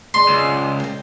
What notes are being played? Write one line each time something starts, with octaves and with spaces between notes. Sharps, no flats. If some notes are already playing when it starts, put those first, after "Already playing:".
G#3 D5 D#5 C6
C#2
A#2 G5